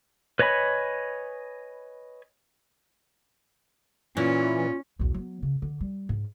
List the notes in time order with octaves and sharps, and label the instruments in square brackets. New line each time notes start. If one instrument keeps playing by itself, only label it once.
[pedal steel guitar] B4 C#5 D#5 G#5 B5
[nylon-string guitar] A#2 [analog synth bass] E3 [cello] C#4 [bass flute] F4
[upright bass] B1 E2
F#3 B3
C#3
D3
G3
G#2